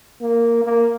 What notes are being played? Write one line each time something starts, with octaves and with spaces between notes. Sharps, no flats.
A#3
A#3